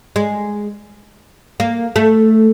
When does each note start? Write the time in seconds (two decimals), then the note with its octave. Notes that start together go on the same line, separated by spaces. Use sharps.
0.16 G#3
1.60 A#3
1.96 A3